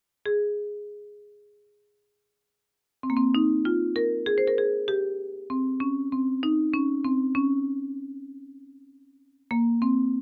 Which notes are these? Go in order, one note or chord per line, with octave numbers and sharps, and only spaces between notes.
G#4
C4
A#3
C4
D#4
F4
A#4
G#4
C5
A#4
G#4
G4
C4
C#4
C4
D#4
C#4
C4
C#4
A#3
C4